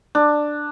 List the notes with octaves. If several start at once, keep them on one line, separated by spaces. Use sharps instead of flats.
D4